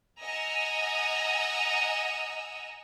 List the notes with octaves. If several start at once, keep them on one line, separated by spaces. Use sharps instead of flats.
D#5 F#5 G#5 A#5 D#6 E6